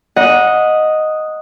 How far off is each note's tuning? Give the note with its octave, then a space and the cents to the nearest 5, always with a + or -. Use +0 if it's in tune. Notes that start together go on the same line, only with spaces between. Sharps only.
D#5 +0 F#5 -15 A#5 +35